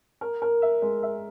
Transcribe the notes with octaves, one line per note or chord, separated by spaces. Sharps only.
A#4
A#4
E5
G#3
E5